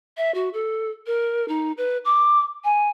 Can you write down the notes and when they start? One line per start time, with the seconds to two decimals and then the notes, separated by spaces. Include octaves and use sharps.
0.17 E5
0.34 F#4
0.54 A4
1.07 A#4
1.48 D#4
1.77 B4
2.05 D6
2.64 G#5